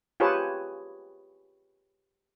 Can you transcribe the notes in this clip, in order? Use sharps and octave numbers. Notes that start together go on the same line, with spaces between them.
F4 G4 G#4 B4 C#5 A5